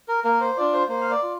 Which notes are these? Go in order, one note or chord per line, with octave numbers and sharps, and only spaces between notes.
A#4
A#3 A#4
C5
D4 F4 D5
C5
A#3 C5
F5
D5
F4